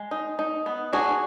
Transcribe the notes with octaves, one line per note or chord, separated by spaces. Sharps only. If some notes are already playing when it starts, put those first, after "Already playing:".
Already playing: G#3
D#4
D#4
B3
D4 F#4 G#4